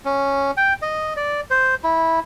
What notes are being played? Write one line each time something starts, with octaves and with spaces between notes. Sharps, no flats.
C#4
G5
D#5
D5
C5
E4